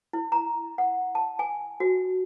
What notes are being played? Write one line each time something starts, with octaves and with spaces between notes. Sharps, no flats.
E4
A#5
F#5
A5
G#5
F#4